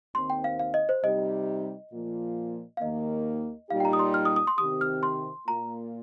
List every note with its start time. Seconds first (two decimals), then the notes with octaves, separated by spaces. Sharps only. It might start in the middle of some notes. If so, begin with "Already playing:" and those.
0.15 D#2 D#3 C4 C6
0.30 G5
0.44 F5
0.59 F5
0.74 D#5
0.89 C5
1.03 C3 G3 D#4 G4 D#5
1.92 A#2 F3 A#3 F4
2.77 F5
2.81 D#2 D#3 A#3 D#5
3.70 A#2 G3 D#4 G4 F5
3.80 G5
3.85 A#5
3.93 D#6
3.99 C6
4.14 F6
4.25 D#6
4.36 D#6
4.47 C6
4.58 C3 D#3 C4 G4 D#6
4.81 F6
5.03 C6
5.47 A#2 A#3 F4 A#5